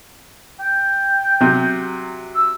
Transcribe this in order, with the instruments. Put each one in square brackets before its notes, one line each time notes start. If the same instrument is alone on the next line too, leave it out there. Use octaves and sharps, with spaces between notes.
[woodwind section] G5
[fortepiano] C3 F#3
[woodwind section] E6